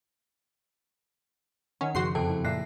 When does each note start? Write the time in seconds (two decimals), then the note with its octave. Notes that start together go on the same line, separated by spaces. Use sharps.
1.81 D#3 C#4 F#5
1.95 F#2 C#3 F3 C#4 F#4 G#4 C6 C7
2.15 F2 C3 A4 G5 A5 D7
2.29 E4
2.44 A#2 E5 F#6 A#6 C7